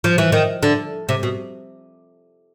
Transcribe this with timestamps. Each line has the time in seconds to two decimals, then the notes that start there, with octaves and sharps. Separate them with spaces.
0.04 F3
0.18 E3
0.32 D#3
0.63 D3
1.09 C3
1.23 B2